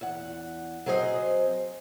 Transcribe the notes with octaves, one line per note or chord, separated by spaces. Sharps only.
E2 F#5
F#3 C4 G#4 C5 D#5